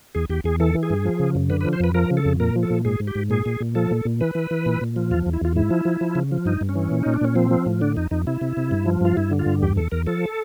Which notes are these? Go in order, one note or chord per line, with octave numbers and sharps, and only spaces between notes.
E2 G#4
E2 G4
E2 G#4
E3 A4
E3
G#4
G2
F3
C#3
F#2
D3 B4
B4
F3
C5
F2 B4
F3 A#4
C#3
A4
F2
A#2 A#4
F3
A4
A#2
G#2 G#4
G#2
G4
G#2
A#2 G#4
A#2
A#2
F3 A4
A#2
A#2
E3 B4
E3
E3
A#2
A#2
F3
E2 F4
E2
E4
E2 F4
G#2 E4
F3
F3
F3
C#3
F3
G2 D#4
G2
C#4
E3
A#2
A#2 D#4
D4
A#2 C#4
F3 C4
F3
A2
D3 D4
F2 D#4
F2 D#4
C3 E4
C3
C3
G2
F3
G2 F4
G2 E4
D3
F4
G2
E2 G4
E2 A4
E2 A#4
F3 A4